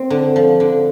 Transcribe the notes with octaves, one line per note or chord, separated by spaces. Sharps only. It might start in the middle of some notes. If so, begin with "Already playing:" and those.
Already playing: C4
D3
F3
D3